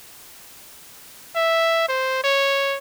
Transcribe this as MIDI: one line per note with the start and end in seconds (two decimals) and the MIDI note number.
1.36 1.88 76
1.89 2.20 72
2.24 2.78 73